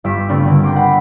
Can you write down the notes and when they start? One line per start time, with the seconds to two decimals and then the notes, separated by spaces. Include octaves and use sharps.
0.04 G1 G2 D6 E6 G6 B6
0.29 C#3 G3 A3 B3 C4 D4
0.45 D3 A#3 C4
0.63 G5 A#5 C6 D6
0.76 F#5 B5